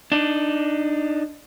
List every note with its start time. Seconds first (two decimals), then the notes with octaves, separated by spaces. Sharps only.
0.12 D4 D#4